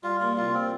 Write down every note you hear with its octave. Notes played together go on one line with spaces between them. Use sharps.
G3 F4
A#2 F4
C2 F4
C4